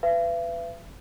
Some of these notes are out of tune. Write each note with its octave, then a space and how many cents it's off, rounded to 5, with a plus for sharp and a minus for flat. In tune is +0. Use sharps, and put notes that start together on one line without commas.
B4 +25 E5 +45